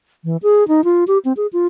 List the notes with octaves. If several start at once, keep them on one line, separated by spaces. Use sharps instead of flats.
E3
G#4
D#4
F4
G4
C4
G#4
F4